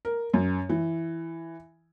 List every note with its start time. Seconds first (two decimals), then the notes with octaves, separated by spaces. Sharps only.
0.05 A#4
0.34 F#2
0.69 E3